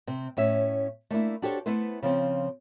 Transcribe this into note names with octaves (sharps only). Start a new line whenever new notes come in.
C3 C4
A2 C#4 E5
A3 A#3 D4 E4
D4 F#4 G4 A4 C5 C#5
A3 B3 E4 B4 C5
C#3 F3 C4